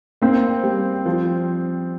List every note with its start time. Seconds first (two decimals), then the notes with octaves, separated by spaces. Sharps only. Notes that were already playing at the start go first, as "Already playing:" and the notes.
0.22 A#3 C4
0.63 G3
1.06 F3